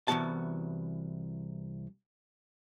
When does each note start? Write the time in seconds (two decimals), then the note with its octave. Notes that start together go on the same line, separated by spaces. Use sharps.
0.08 C2 G#2 E3 B3 F#4 A5